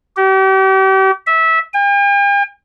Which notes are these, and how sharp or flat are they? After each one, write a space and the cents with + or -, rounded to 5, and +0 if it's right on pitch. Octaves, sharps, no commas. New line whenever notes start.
G4 -40
E5 -20
G5 +45